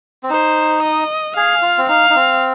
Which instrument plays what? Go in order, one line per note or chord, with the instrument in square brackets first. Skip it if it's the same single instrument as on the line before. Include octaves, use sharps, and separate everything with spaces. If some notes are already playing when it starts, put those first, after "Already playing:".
[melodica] C4
[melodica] D#4 [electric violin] C5
[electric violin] D#5
[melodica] G#4 [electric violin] F5
[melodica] F4
C4
[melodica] D#4 [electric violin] F5
[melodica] D#4
C4